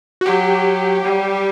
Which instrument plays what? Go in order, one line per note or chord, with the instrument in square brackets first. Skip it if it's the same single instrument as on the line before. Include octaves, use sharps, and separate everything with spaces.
[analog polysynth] F#4
[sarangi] F#3 [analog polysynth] G4
[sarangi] G3